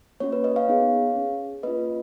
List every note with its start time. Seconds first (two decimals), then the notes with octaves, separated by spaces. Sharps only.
0.20 A#3 C#4 F#4 C#5
0.32 B4
0.44 B4 D#5
0.56 C#5 F5
0.68 B3 D#4 G#4
1.16 C#4 G#4
1.63 A#3 C#4 F4 B4 D#5